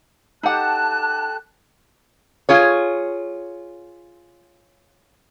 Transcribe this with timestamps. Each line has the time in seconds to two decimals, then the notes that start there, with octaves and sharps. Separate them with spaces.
0.43 D#4 G4 A4 F#5 A5 F#6
2.49 F4 G#4 C#5